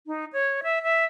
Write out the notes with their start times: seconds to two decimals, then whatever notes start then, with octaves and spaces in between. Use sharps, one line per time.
0.07 D#4
0.33 C#5
0.63 E5
0.83 E5